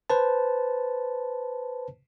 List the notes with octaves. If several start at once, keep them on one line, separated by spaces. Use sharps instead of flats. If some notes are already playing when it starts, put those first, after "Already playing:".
B4 C5 A5